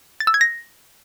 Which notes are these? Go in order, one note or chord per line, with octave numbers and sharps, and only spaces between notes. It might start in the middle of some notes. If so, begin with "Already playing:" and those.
A6
E6
G#6
A#6